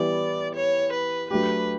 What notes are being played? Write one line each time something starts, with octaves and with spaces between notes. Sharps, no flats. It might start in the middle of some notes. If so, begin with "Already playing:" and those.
Already playing: E3 G3 B3 E4 D5
C#5
B4
F#3 A3 D4 G4 B4